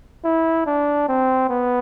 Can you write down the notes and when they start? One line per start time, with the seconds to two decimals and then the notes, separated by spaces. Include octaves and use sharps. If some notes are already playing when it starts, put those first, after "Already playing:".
0.24 E4
0.67 D4
1.09 C4
1.49 B3